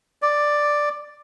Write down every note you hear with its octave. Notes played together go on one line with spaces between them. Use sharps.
D5